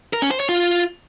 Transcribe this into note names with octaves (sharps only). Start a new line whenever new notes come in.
A#4
C#4
C5
C#5
F4